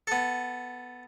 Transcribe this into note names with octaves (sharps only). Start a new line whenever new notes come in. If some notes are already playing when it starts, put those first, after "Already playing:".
B3 A4